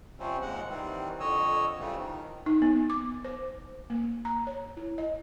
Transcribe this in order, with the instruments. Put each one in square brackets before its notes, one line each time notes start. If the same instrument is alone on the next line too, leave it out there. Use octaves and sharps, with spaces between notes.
[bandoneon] C3 F3 G3 C4 C#4
D#2 G#2 G#3 F#5
D#3 E3 G3 C4
F2 D3 C#5 D#5 E6
C#3 E3 F3 G3 A3
D#3
[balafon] D#4
B3
D6
C5
A#3
A#5
C#5
E4
D#5